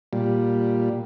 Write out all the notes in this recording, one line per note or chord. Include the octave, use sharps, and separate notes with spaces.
A#2 G3